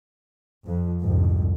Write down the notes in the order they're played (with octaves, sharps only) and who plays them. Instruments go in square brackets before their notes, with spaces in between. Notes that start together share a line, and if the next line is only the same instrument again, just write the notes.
[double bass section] F2
C2 F2 G#2